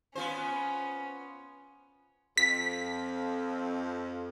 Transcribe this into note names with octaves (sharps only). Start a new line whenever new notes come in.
B3 C#4 F4 C5
F2 B6